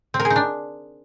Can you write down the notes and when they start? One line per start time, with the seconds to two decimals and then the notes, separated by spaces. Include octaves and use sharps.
0.14 C4
0.20 A#4
0.25 G#4
0.30 D#4
0.36 D4